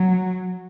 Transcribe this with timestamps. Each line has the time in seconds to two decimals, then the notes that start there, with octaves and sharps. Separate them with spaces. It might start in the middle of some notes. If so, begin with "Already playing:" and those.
Already playing: F#3